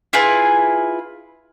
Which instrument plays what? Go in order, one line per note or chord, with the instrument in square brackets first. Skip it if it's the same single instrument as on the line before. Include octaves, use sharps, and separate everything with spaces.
[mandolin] E4 F4 G#4 B4